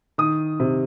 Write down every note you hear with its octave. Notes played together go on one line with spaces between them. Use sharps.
D#3 D#6
C3